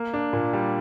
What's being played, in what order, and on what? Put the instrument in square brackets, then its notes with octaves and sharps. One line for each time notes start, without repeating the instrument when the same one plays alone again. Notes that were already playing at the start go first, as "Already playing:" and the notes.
Already playing: [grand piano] A#3
D4
A#2
G3